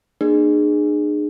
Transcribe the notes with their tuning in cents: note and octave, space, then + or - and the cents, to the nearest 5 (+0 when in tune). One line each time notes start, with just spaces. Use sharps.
A#3 +10 D4 +45 G#4 +0